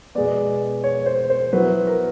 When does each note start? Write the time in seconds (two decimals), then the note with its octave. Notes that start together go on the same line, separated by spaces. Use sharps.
0.15 B2 G#3 B3 D5
0.84 C#5
1.06 C5
1.30 C5
1.53 F#3 B3 E4 B4
1.87 A#4